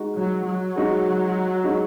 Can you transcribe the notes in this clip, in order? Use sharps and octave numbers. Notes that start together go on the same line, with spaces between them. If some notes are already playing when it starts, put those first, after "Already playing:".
Already playing: G#3 D#4 F#4
F#3
F#3
G#3 D#4 F#4
G#3 D#4 F#4